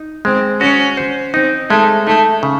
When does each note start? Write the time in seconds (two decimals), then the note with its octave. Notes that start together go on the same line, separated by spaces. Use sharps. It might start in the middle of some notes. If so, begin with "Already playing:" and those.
Already playing: D#4
0.25 G#3 C4
0.61 C#4 F#4
0.97 C5
1.34 C4 D#4
1.70 G#3 A3
2.07 A3 D#4
2.43 C#3